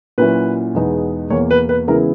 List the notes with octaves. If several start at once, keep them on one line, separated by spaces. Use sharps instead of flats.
A#2 F#3 C#4 E4 B4
E2 B2 G#3 B3 D#4
E2 B2 A#3 C#5
B4
B4
C#3 E3 G#3 B3 E4 A#4